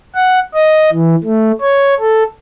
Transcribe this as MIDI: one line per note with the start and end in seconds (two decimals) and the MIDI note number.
0.15 0.39 78
0.54 0.90 75
0.92 1.15 52
1.24 1.52 57
1.61 1.94 73
2.00 2.24 69